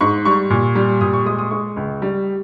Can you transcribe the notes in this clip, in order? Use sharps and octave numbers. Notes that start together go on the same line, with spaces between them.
G#2 C#6
G3 C#6
A#2
G3
A#2 D#6
C#6
G#3 D#6
D#6
G#3 C#6
C#2
G3